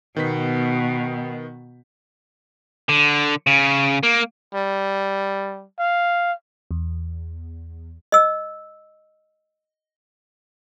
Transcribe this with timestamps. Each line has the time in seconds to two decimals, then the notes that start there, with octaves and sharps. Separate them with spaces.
0.16 B2 D#3 B3 B6
2.89 D3
3.47 C#3
4.03 A#3
4.54 G3
5.79 F5
6.71 E2
8.12 D#5 E6